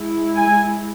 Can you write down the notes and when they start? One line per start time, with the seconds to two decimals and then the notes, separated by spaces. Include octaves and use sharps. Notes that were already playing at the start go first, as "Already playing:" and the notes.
Already playing: G#3 E4
0.37 G#5